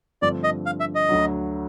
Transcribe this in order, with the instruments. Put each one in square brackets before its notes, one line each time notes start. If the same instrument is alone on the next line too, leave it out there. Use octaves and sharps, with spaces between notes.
[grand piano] G2 D3 F3 A3 C4 [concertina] D5
[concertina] D#5
F5
E5
D#5
[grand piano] D2 D3 F#3